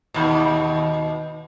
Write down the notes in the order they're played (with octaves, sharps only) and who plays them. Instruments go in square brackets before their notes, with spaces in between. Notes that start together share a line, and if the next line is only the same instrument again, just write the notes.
[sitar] D#2 B2